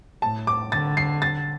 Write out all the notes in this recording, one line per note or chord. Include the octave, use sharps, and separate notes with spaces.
A2 A5
D6
D3 A6
C7
A6